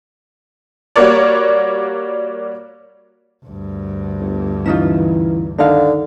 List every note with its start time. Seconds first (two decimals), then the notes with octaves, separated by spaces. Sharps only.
0.96 G3 A#3 F#4 A#4 C#5 D5
3.45 D2 G2
4.20 G1
4.66 E3 C#4 D#4 F4
5.58 D3 D#3 D4 D#4 F5